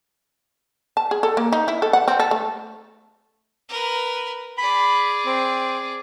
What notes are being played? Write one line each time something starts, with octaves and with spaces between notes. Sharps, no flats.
A5
G#4
A4
A#3
D#4
E4
A4
F#5
C4
A4
A3
A#4 B4
G#4 D5 B5
C4